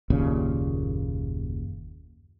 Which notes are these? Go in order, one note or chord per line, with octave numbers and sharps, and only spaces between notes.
F#1 D#2 A#2 C#3